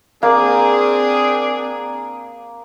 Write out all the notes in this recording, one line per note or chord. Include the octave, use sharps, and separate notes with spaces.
A#3 C4 D4 G#4